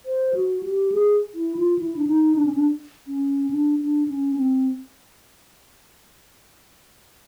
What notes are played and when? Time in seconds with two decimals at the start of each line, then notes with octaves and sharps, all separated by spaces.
0.06 C5
0.34 F#4
0.63 G4
0.92 G#4
1.35 E4
1.56 F4
1.79 E4
1.96 D4
2.07 D#4
2.36 D4
2.45 C#4
2.55 D4
3.07 C#4
3.50 D4
3.79 D4
4.08 C#4
4.37 C4